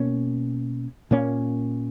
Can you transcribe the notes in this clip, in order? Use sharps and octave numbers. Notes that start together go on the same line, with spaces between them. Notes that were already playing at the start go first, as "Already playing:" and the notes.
Already playing: B2 A#3 C#4
A#2 A#3 C#4